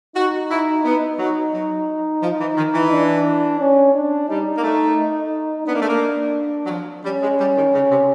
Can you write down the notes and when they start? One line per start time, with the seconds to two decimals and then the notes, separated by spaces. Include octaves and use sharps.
0.16 D#4 F#4
0.51 E4
0.85 B3
1.19 F#3
1.53 F#3
2.22 F3
2.40 E3
2.57 D#3
2.74 E3
2.91 D4
3.61 C#4
3.95 D4
4.29 G3 D#4
4.57 A#3
4.63 A3
5.67 B3 D4
5.74 A#3
5.81 A3
5.88 A#3
6.66 F#3
6.70 F3
7.05 G3 C#4
7.22 G#3
7.39 G3
7.57 D#3
7.74 C#3
7.91 C3